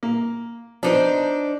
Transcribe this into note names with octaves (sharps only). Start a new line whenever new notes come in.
A#3
F3 B3 D4 D#4 C5